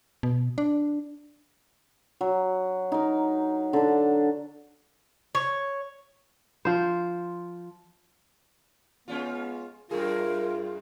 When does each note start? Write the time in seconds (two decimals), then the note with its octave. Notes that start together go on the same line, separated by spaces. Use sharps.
0.23 B2
0.58 D4
2.21 F#3
2.92 D#4 A#4
3.73 D3 D4
5.35 C#5
6.65 F3 C5
9.08 G#3 B3 C#4 F4
9.91 F#2 A3 F4 G#4 A#4